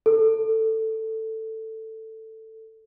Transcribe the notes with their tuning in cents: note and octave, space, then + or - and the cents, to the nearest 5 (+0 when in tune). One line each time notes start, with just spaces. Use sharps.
A4 +10